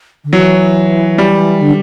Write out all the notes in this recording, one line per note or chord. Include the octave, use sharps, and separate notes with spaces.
D3
E3 F#3
G3
D3